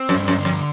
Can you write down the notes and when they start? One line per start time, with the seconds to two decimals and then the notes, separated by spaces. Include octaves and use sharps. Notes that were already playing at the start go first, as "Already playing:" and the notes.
Already playing: C4
0.09 F#2
0.15 G2
0.28 F#2
0.39 D3
0.45 F2